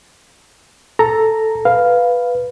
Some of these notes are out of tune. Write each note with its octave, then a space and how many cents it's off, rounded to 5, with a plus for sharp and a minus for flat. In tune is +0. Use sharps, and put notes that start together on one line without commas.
A4 +0 A#5 -5
B4 +0 F5 +0